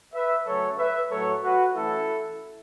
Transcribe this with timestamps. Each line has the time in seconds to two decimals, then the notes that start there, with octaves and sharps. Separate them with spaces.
0.14 B4 E5
0.46 C#3 F#3 A3 C#4 A4 C#5
0.78 B4 E5
1.10 A2 F#3 A3 A4 C#5
1.42 F#4 B4
1.75 E3 A3 C#4 E4 A4